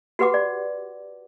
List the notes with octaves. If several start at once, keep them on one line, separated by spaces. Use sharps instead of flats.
F#4 G4 B4 F#5 D6
D5